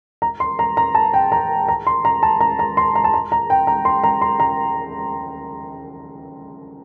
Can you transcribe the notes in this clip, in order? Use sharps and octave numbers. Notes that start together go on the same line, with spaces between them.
A#5
C6
A#5
A#5
A5
G5
A#5
A#5
C6
A#5
A5
A#5
A#5
C6
A#5
A5
A#5
A#5
G5
A#5
C6
A#5
C6
A#5